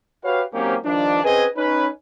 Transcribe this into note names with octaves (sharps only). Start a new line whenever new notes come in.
F#4 G4 B4 C#5 F5
G#2 F#3 A#3 C4 C#4 G4
G2 D#3 F3 D4
C4 C#4 G#4 B4 D#5 G#5
C#4 D#4 B4